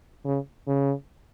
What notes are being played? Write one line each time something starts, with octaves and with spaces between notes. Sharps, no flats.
C#3
C#3